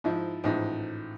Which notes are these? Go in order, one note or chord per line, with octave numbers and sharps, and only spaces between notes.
G#2 F3 E4
A1 G#2 F3